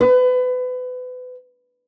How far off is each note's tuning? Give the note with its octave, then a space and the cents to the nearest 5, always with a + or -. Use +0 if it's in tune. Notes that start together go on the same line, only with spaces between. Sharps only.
B4 +30